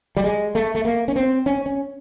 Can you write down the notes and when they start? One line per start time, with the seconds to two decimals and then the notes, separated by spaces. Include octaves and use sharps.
0.17 G3
0.24 G#3
0.55 A3
0.75 A3
0.85 A#3
1.08 C#4
1.16 C4
1.46 C#4
1.66 C#4